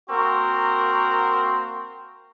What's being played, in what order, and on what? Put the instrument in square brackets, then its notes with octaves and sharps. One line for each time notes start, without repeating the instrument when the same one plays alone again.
[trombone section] A#3 C4 F#4 A#4